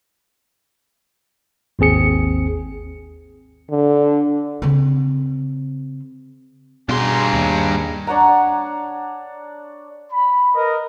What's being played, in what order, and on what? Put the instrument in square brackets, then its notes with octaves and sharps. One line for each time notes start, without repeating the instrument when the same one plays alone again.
[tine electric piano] G#1 D#2 C4 G#4 C#7
[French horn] D3
[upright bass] C#3 C4
[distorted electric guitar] G2 C6 [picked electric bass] B2 [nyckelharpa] G#4 A#5
[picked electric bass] D#2
[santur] D4 C#5 F#5 A#5
[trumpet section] B5
A#4 B4 D#5